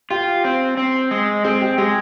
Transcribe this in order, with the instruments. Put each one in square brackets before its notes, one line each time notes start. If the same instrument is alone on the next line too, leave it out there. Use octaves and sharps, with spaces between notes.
[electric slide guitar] F4 [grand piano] G4
[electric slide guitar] C4
C4
G#3
[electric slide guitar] C4 [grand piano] G#4
[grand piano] G4
[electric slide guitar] G#3 [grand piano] G4